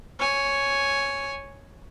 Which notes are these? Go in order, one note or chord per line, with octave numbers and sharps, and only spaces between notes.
C#5 G#5